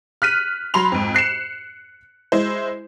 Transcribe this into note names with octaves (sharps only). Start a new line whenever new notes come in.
F6 F#6 B6 D#7
F#3 B5 C6 F7
F2 G#2
F#6 C7 C#7 E7
G#3 E4 C5